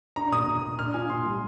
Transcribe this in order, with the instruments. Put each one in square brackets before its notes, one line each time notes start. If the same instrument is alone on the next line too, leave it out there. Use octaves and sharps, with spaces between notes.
[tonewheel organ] D4 [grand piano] A#5
[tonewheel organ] A#2 [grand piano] D#6
[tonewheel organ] A#2
A#2
[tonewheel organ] D4 [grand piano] F6
[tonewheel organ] F4 [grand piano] G#5
[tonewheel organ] A#2 [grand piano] C6
[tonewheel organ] G3